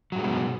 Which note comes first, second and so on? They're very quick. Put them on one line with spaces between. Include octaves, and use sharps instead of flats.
F#3 G2 G#3 B2